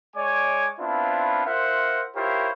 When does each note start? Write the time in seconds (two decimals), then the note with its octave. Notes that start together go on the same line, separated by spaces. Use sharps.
0.16 G#3 C#5 D5 G#5 D6
0.80 B3 C4 D4 E4 F4
1.46 F4 A#4 C5 E5 F#5 C6
2.15 E4 F4 G4 A#4 C5 C#5